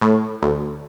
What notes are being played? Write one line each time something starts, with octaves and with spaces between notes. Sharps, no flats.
A2
D2